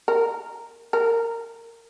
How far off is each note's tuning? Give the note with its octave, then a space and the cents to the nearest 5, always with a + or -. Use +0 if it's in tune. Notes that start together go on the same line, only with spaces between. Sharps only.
A#4 -5
A#4 -15